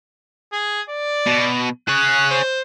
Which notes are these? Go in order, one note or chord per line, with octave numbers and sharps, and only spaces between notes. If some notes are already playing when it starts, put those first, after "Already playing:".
G#4
D5
B2
G#4 C#5 F#6
C5